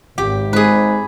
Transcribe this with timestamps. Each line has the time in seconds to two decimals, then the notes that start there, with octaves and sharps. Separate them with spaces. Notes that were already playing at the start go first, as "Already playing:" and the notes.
0.18 G#1 G4
0.53 G#2 G#4 B4